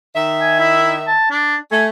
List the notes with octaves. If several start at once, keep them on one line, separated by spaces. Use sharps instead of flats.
D#3 E5
G#5
E4
A5
D4
A3 G#5